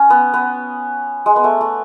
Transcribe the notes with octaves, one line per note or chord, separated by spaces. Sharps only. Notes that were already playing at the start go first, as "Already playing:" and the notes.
Already playing: C#4
B3
B3
G#3
B3
A3
A3